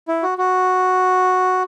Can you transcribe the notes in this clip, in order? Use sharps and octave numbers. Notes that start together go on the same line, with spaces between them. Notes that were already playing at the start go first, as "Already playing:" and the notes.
E4
F#4
F#4